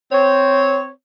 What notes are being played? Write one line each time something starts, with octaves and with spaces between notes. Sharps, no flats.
C4 C#5